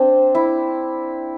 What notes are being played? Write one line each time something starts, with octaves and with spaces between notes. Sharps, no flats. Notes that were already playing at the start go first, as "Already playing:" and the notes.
Already playing: C4 D4
E4